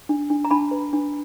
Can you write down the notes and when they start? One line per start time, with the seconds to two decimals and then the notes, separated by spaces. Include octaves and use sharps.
0.09 D4
0.30 D4
0.45 A#5
0.50 D4 A5 B5
0.71 B4
0.93 D4